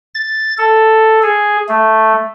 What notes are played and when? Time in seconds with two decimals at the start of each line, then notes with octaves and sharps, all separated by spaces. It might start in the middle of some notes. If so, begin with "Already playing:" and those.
0.15 A6
0.58 A4
1.23 G#4
1.69 A3